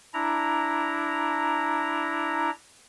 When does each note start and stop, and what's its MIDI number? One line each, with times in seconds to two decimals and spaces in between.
0.14 2.50 62
0.14 2.50 64
0.14 2.50 82